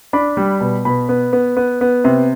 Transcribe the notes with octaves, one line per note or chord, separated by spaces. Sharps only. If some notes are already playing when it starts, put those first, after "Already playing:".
D4 B5
G3
B2
B2 B5
B3
B3
B3
B3
C3